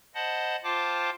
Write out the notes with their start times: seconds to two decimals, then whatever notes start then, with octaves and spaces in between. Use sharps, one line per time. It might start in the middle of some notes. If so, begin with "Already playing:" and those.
0.15 C5 D#5 F#5 A5 B5
0.64 F4 C5 F5 G5 A5 D6